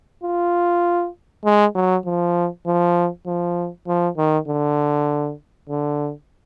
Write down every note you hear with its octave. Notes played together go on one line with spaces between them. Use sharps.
F4
G#3
F#3
F3
F3
F3
F3
D#3
D3
D3